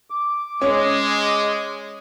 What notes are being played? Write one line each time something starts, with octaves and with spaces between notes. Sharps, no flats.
D6
G#3 C#4